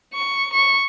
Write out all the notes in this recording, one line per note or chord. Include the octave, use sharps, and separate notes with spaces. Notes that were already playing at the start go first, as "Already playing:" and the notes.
C#6
C#6